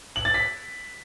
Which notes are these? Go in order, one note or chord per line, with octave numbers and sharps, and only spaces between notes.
F#7
A6
B6